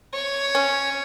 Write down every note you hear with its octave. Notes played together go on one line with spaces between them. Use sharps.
C#5
C#4